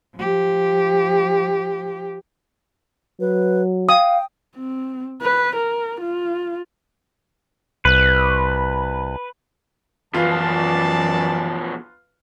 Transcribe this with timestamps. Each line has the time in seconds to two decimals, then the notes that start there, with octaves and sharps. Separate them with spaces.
0.17 F3 G4
3.20 F#3 B4
3.89 F5 G5 D#6
4.56 C4
5.22 B4
5.56 A#4
6.01 F4
7.85 C2 B4
10.14 F#2 B2 E3 F3 F4 B4 D5 A5